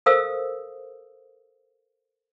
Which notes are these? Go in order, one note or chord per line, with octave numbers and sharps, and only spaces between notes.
A4 A#4 C5 F5 D#6 E6